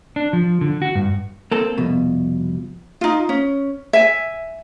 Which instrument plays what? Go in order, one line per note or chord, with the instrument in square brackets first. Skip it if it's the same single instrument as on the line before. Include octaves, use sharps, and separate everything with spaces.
[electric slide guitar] D4
F3
D3
F#4
G2
[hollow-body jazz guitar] A#3 C4 A4
C2 F2 B2
[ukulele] D#4 F4
C#4
E5 G#5